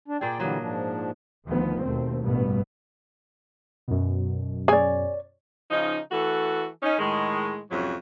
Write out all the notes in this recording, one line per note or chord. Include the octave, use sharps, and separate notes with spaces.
D4
A#2 G#4 D5 G5
D3 E3 F#3 G3 A#3 D#5
G#2 F3 D4
D2 D#3 F3 B3
D#2 B2 A3 C4
A1 G2 B2 B3
F#2 B2
G#4 C#5 D5 G#5
C#3 F3 D#4
E3 A3 F#4 A4
C#4 D#4
A2 D#3 G#3
F2 G#2 C3 F#3 C#4